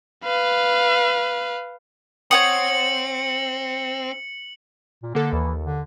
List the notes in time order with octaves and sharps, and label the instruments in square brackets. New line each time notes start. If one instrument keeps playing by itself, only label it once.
[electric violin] B4 F5
[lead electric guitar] C4 [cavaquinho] C#5 F#5 D#6 [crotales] C#7 F#7
[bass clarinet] A#2
[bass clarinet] D3 [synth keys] A#3 A4
[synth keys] D#2 [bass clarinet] E3
[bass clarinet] D3